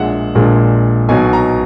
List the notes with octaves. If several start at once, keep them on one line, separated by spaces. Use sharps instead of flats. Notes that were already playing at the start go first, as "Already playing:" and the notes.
Already playing: A#1 A#2 G#3 E5 F#5
A#1 A#2 G#3
B1 B2 F#3 G#5
A#5